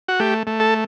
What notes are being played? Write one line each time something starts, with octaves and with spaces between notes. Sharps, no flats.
F#4
A3 G4
A3
A4